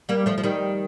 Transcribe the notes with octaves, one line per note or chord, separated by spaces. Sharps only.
G3 A#3
F3 A3
F3
D#3 G3